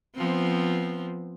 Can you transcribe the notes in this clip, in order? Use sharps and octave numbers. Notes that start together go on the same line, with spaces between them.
F3 B3 C4